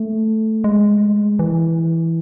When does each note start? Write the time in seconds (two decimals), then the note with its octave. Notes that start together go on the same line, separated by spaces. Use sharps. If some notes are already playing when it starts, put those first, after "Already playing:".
Already playing: A3
0.64 G#3
1.39 E3